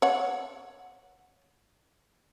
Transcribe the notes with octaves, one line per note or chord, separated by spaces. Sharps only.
C#5 F#5